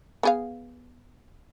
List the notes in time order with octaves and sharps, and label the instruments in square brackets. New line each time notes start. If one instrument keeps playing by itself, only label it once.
[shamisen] B3 G#4 F5